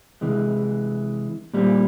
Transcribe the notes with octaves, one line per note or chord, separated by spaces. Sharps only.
C3 E3 G#3
A#2 G3 C4